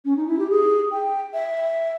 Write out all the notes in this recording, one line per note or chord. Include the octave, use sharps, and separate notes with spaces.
C#4
D#4
E4
G4
G#4
G5
E5